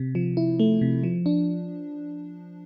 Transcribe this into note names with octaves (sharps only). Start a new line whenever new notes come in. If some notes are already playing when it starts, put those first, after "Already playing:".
Already playing: C3
F3
E4
A3
C3
F3
D4